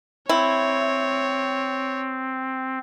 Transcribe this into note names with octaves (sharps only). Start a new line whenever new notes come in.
C4 E4 C#5